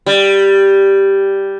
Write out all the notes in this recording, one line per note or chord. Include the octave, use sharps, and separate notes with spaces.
G3